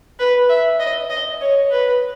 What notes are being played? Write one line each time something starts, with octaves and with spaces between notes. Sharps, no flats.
B4
E5
D#5
D#5
C#5
B4